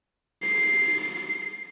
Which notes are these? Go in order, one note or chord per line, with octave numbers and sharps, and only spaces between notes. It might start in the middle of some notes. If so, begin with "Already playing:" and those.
C7